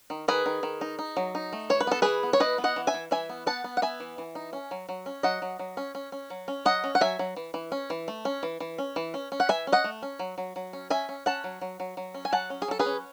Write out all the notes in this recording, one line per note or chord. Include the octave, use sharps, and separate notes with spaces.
D#3
D#3 G#4 B4
D#3
D#3
D#4
D#4
F#3
D#4
A3
E3 C#5
B4
B3 A4
E3 G#4 B4
B3
C#5
E3 B4 D#5
B3
D#5 F#5
E3
E5 G#5
E3
E3 E5 G#5
B3
B3 F#5 A5
B3
F#5
B3 E5 G#5
E3
E3
D#4
C#4
F#3
F#3
C#4
F#3 D#5 F#5
F#3
F#3
C#4
C#4
C#4
F#3
C#4
F#3 D#5 F#5
C#4
F#5
F#3 E5 G#5
F#3
E3
E3
C#4
E3
A3
C#4
E3
E3
C#4
E3
C#4
C#4
F#5
E3 E5 G#5
C#4
D#5 F#5
A3
C#4
F#3
F#3
F#3
C#4
C#4 E5 G#5
C#4
C#4 F#5 A5
F#3
F#3
F#3
F#3
C#4
G#5
F#3 F#5 A5
C#4
G#4
F#3 A4
G#4 B4
C#4